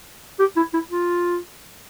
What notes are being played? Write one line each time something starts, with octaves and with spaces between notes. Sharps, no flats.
G4
E4
E4
F4